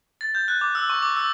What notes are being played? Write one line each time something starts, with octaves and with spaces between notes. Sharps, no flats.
A6
G6
F#6
D6
E6
C#6
D6
E6